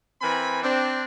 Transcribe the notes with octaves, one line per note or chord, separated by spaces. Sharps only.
E3 C4 A#4 G#5 B5
C4 D4